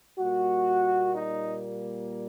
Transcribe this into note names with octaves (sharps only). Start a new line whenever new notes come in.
A#2 G3 A#3 F#4
D#4